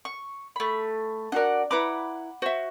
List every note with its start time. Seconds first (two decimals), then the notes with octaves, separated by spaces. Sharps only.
0.05 C#6
0.56 A3 B5
1.32 D4 F#4 A#4 D5 F#5
1.71 E4 B4 F#5 A#5 B5 D6
2.42 F#4 C5 E5